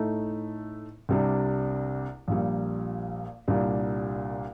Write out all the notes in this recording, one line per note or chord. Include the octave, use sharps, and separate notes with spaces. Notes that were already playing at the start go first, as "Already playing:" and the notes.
Already playing: A2 A3 D#4
C2 C3 G3 D4
A#1 A#2 G3
C2 A#2 G3 D4